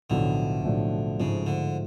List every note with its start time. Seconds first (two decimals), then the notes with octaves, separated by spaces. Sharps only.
0.10 B1 A2 D3 F3 A3 D4
0.64 B1 A2 F3 A3 D4
1.19 G#2 C#3 F3 A3
1.46 D3